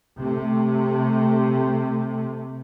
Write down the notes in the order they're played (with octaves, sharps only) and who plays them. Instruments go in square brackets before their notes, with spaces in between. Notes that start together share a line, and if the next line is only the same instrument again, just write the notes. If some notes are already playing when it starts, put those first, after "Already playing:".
[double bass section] C3 A3